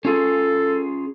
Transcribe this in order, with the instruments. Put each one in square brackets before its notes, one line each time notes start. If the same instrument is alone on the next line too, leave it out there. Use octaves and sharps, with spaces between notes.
[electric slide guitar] C#4 F4 G#4 [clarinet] A4